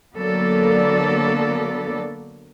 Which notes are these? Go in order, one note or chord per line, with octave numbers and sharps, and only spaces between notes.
D3 F#3 A#3 B3 A4 D5